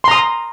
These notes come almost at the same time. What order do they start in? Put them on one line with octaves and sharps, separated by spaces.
C6 A#5 D#6